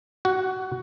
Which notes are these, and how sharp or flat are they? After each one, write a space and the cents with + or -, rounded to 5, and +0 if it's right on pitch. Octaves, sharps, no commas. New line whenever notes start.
F#4 +20 F#5 +0